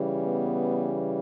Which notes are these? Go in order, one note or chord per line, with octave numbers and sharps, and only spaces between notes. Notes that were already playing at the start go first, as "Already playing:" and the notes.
Already playing: C#3 E3 G3
B3